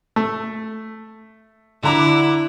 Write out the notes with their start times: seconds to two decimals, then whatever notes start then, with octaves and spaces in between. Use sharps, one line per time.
0.16 A3
1.83 D3 E4 A#5 D6